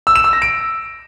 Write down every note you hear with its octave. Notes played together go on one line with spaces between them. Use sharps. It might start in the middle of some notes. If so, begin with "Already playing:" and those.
E6
E7
E6
A#6
D7